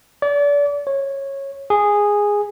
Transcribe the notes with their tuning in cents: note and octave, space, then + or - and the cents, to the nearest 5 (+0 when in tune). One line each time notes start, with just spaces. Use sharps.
D5 -35
C#5 -15
G#4 -10